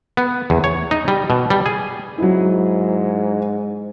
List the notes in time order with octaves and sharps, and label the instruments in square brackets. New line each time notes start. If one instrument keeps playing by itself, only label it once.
[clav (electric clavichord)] B3
E2
C#5
D#4
G3
B2
G3
G#4
[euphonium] G#2 [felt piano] F#3 E4